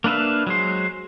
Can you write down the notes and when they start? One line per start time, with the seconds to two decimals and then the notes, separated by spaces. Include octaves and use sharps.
0.04 A#3 D4 B4 E5 F5
0.47 F#3 G#3 C5